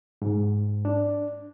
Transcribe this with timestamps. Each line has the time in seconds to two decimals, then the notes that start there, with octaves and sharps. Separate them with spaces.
0.22 G#2
0.85 D4